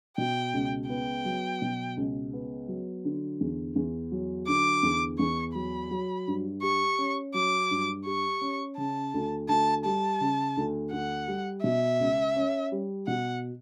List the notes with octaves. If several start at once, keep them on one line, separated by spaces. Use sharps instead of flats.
B2 G5
C#2
B3 G5
F#3
B2
C#2
B3
F#3
D3
E2
E2
F#3
D3 D6
E2
E2 C#6
F#3 B5
F#3
G2
G4 C#6
C#4
F#3 D6
G2
G4 C#6
C#4
C#3 A5
D2
D2 A5
G3 A5
C#3
D2
D2 F#5
G3
B2 E5
C#2
C#4
G3
B2 F#5